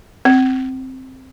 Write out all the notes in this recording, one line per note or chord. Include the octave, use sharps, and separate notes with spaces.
C4